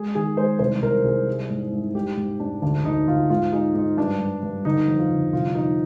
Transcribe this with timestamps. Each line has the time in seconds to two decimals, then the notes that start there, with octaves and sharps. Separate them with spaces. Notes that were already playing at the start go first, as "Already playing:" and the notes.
Already playing: G#3 G#4
0.15 D#3 G#4
0.37 G#3 C5
0.59 C2 C5
0.82 C2 A#4
1.04 C2 G#4
1.27 G3
1.50 G#2
1.72 G#2
1.95 G#2 G4
2.17 G#2
2.40 G#2 D4
2.62 D2 D4
2.85 D2 D#4
3.07 D2 F4
3.30 G#2 F4
3.52 G#3 D#4
3.75 G#2 D#4
3.97 G2 D4
4.20 G2
4.43 G2
4.65 D3 D#4
4.88 F2
4.99 F4
5.11 D3
5.33 C2 F4
5.55 F3 D#4